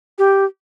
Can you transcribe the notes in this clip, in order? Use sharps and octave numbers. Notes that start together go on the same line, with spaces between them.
G4